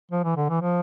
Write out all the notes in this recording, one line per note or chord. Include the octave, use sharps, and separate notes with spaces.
F3
E3
D3
E3
F3